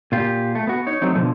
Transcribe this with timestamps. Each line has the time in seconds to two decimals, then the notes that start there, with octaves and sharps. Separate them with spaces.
0.12 A#2 F4 G4
0.55 A3
0.67 B3 F#4
0.87 D#4 C#5
1.02 F#3 A3 C4 D#4
1.15 B2 D3 F3